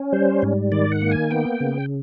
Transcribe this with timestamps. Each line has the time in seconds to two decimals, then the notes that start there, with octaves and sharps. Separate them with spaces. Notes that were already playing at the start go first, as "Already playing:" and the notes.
Already playing: C#4
0.13 G3 C5
0.42 G#2
0.72 D#3 D5
0.92 F#5
1.01 A#3
1.11 G#5
1.31 B3 G5
1.60 C#3